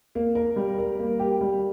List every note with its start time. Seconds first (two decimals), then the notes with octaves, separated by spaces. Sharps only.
0.15 A#3
0.35 A#4
0.56 G3
0.78 A#4
0.99 A#3
1.19 G4
1.41 G3